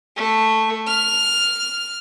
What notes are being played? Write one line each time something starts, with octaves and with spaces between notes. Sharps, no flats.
A3
F6